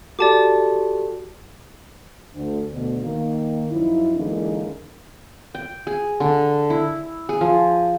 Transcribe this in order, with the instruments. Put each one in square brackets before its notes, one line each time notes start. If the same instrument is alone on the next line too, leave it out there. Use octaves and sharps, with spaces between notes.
[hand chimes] F#4 G4 A4 [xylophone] D5 A5 D6
[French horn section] D2
D2 B2
D#3 A#3
F#2 F3 D#4 E4
D3 E3 G#3 A#3 C#4 D#4
[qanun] G5
G#4
D3
E4
G#4
F3